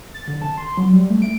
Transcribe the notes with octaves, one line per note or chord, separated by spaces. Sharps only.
A6
D3
A5
C6
F#3
G3
A3
D7